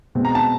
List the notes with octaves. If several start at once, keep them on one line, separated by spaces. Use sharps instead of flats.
B2 G#3 C4
A#5
A5